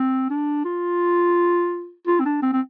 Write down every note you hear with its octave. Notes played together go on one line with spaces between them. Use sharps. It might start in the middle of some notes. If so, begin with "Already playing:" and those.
Already playing: C4
D4
F4
F4
C4
D4
C4
C4